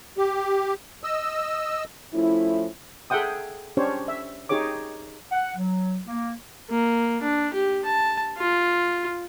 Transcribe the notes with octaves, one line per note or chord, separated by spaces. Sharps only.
G4
D#5 E6
F3 A3 C#4 E4
G#4 A4 E5 F#5 G5 D#6
C#4 D4 G4 C5 C#5
E5
D#4 G4 G#4 C#5 D6
F#5
F#3
A#3
A#3
D4
G4
A5
F4